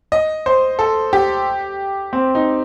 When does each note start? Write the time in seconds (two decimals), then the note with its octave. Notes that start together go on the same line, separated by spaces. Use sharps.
0.12 D#5
0.46 C5
0.79 A4
1.13 G4
2.13 C4
2.35 D#4